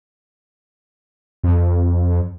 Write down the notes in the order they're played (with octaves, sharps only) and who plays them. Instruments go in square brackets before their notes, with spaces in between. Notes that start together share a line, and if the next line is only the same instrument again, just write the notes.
[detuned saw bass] F2